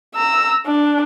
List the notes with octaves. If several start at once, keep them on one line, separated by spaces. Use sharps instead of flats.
A#5 E6
D4